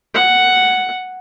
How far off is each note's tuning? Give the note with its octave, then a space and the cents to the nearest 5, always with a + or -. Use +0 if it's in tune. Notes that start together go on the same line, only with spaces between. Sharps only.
F#5 +0